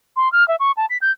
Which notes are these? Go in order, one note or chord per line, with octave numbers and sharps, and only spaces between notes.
C6
F6
E5
C#6
A5
B6
G6